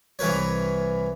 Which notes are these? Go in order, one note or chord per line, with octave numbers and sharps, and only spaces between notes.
C2 E3 A#4 B4 C#5